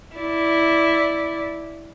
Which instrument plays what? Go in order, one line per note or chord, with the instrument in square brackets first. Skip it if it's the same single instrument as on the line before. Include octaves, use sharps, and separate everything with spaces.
[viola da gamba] E4 D5